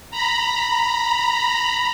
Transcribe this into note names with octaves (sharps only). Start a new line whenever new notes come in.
A#5 B5